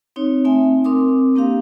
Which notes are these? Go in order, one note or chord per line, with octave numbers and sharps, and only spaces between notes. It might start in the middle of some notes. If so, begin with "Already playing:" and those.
C4 D#4 C#5
A3 C4 D#4 E5 G#5
C4 A#4 C6 D6 D#6
A#3 D4 G4 F5